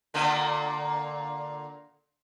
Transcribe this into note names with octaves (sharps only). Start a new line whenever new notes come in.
A#2 D3 A#3